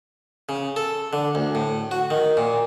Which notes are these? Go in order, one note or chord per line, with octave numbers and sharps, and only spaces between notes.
C#3
A4
D3
D2
A2
F#4
D#3
A#2